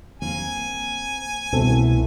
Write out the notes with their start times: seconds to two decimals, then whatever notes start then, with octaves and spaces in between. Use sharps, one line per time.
0.22 A#3 C4 A#4 G#5
1.53 C2 B2 E3 A3 B3 C4 A4